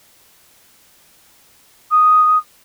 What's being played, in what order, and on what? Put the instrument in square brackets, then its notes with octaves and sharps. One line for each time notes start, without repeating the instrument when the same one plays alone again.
[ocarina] D#6